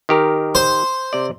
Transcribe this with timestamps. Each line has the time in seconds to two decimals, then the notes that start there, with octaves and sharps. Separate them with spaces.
0.09 D#3 G4 A#4
0.55 C5
1.13 C3 D5